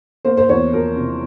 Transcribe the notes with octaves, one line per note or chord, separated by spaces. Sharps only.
A#3 C5
C5
E2 C#5
F3 A#4
C3